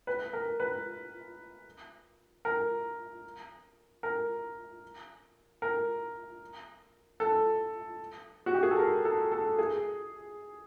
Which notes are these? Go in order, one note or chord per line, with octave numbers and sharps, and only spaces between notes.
B4
A#4
B4
A#4
A#4
A#4
A4
F#4
G4
G#4
A4
A#4
A4
A4
G#4